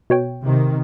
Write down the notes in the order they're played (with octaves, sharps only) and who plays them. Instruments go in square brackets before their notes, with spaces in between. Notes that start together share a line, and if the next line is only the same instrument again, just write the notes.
[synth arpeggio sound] B2 C#5 G5
[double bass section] C3 D#3